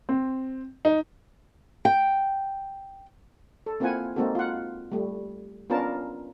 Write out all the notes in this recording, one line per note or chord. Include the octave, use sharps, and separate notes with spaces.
C4
D#4
G5
A4
A#3 C4 E4 F4 F#5 G#5
G#3 A#3 C4 D#4 F#4 A4
F4 F#5
G3 A3
B3 C#4 D4 F4 A#4 A5